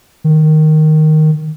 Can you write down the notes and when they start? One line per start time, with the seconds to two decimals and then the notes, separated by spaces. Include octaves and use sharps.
0.24 D#3